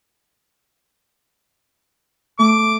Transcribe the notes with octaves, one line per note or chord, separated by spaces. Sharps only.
A3 D6